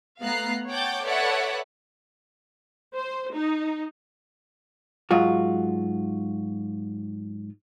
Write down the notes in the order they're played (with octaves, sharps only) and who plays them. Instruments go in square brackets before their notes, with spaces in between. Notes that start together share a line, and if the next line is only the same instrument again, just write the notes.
[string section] A3 B3 F5 A#5 F#6 C7
C#5 F#5 G5 A5 D6 G6
A4 B4 C#5 D5 E5 F#5
[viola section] C5
D#4
[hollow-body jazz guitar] G#2 F#3 F4 F#4